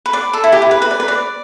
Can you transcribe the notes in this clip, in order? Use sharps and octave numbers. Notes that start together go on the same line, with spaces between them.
B4
D5
A4
E4
G4
E4
B4
B4
D5
B4
D5